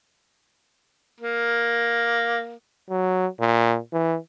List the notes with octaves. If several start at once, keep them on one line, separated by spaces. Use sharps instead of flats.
A#3
F#3
A#2
E3